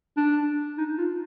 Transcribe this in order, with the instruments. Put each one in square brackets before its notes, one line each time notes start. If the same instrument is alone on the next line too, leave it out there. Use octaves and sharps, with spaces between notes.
[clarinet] D4
D#4
F4